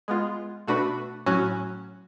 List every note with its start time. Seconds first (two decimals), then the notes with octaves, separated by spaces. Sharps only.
0.08 G#3 B3 F4
0.67 B2 A3 D4 F#4 B4
1.26 A2 F#3 C#4 F#4